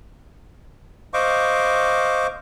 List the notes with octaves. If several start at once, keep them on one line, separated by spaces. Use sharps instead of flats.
C5 D#5 F5 C#6 D6